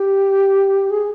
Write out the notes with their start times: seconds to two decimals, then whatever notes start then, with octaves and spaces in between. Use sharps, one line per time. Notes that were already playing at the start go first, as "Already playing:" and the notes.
Already playing: G4
0.90 G#4